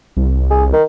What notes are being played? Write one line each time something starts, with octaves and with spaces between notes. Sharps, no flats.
C2
G#4
D#3